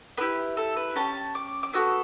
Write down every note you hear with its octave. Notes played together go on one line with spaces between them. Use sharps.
B3 E4 G4 B4
A4
B4
C#4 G4 A5
D6
D6
B3 F#4 A4 E6